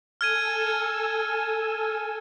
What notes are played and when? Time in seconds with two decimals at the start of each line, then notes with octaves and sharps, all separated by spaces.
0.21 A4 G#5 E6 F6 G#6 D#7